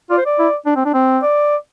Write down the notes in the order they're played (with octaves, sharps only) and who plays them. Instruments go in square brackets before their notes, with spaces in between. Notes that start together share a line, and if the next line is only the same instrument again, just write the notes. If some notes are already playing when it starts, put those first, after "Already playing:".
[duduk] F4 [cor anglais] D5
[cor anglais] C5
D5
[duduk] E4
D4
C4
D4
C4
[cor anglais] D5